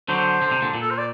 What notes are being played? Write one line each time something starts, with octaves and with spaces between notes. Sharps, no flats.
D3 F#3 C5
D3
C3
A#2 D3
A#2
A4
C5
D5